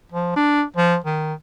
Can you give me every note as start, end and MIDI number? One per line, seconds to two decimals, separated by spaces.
0.12 0.35 53
0.36 0.63 62
0.76 0.97 53
1.04 1.33 51